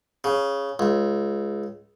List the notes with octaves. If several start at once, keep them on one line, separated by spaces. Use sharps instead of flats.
C#3
C#2